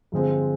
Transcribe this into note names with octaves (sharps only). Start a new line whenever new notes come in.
G2 D3 F3 G#3 C4